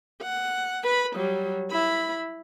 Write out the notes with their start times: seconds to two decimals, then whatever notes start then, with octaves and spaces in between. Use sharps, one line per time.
0.22 F#5
0.84 B4 B5
1.16 F#3 G3
1.71 E4 B5